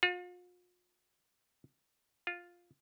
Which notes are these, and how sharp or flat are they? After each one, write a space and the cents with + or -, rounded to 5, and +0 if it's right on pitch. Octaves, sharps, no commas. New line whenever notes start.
F4 +40
F4 +5